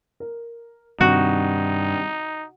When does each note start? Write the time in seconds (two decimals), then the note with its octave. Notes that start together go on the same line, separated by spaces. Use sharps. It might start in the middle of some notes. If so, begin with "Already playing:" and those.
0.20 A#4
1.01 G2 C3 D#3 D#4 F#4